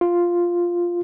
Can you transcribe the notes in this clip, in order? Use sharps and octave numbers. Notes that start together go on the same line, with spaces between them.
F4